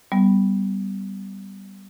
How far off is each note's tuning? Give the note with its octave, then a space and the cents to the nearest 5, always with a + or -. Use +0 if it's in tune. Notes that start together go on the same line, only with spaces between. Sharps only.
G3 -10 B3 +0